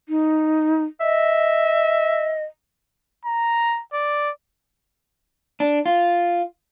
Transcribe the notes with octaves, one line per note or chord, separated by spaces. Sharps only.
D#4
D#5 E5
A#5
D5
D4
F4